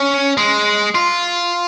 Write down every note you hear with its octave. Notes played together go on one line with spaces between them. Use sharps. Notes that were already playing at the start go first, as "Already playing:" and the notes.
Already playing: C#4
G#3
F4